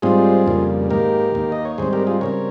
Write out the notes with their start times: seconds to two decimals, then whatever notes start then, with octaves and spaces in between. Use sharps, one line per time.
0.02 G#2 G3 C4 F4 G#4
0.46 F2 C#3 G3 A#3
0.90 G#2 D#3 A#3 G4 A#4
1.35 D#2 D#3 A#3
1.52 D#5
1.65 C#5
1.78 G#2 G3 C4 G#4 C5
1.93 G4 A#4
2.07 F4 G#4
2.21 C#3 G3 C4 A#4 C#5